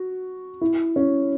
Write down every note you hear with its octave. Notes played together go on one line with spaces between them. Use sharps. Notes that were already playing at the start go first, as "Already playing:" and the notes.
Already playing: F#4
E4
C#4